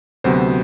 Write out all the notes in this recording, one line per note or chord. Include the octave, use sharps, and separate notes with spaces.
D2 C3 F#3 B3 C5